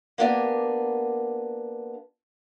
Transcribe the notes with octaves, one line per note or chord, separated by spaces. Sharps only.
A#3 B3 D4 G4 A#4 G#5